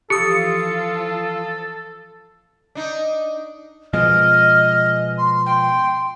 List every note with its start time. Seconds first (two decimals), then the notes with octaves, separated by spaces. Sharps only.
0.10 E3 F3 F4 G4 A4 D#6 C#7
2.75 D4 D#4
3.93 B2 F3 G#3 D#5 F6
5.18 C6
5.46 G5 C6